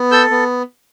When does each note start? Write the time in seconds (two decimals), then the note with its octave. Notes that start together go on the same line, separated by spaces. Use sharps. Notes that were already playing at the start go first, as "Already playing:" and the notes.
Already playing: B3
0.11 A4 E6 G6
0.30 B3